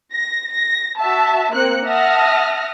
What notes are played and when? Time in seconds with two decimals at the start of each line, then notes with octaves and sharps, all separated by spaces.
0.13 A#6
0.52 A#6
0.99 F#4 E5 A5
1.53 A#3 C4 F#6 C#7
1.86 E5 F#5 A5 D#6 F6 A#6